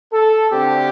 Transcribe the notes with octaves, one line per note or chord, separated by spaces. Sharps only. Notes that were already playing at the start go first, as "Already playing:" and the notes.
A4
D2 D3 A3 C4 G4